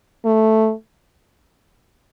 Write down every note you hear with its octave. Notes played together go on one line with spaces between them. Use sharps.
A3